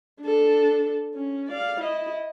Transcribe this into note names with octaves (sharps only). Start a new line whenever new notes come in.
D4 A4
C#4
D5 F5
E4 D#5